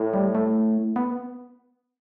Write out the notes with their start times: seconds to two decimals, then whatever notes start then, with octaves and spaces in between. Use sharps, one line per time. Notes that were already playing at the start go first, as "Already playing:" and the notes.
Already playing: A2
0.14 G3
0.35 A3
0.96 B3